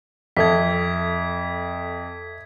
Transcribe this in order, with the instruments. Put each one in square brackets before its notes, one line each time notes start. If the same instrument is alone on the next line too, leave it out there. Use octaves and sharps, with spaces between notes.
[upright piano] F2 [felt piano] A4 E5 [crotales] G#6 B6